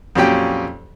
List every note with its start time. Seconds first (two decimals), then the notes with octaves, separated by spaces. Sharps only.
0.15 F2 A#2 F#3 C#4 G4 G5